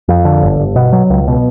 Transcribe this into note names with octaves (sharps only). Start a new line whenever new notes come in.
F2
D3
G1
G1
B2
F#3
C#2
B2